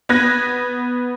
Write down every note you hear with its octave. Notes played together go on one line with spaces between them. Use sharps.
B3 B4 F#6 G#6 A#6